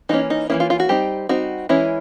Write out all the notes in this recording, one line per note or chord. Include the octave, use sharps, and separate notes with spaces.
E3 G3 A#3 C#4 D#4
D#4
E3 G3 A#3 C#4 E4
F4
F4
F#4
G3 C4 D#4 G4
G3 C4 D#4 F#4
E3 G#3 C#4 E4